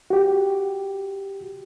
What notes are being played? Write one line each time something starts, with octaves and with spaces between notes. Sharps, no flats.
F#4 G4